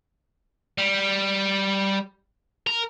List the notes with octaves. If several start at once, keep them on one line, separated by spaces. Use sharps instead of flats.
G3
A#4